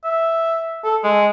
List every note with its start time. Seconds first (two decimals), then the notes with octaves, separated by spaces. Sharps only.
0.04 E5
0.84 A4
1.04 G#3